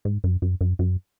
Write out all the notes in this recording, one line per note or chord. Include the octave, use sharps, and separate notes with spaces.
G#2
F#2
F#2
F#2
F#2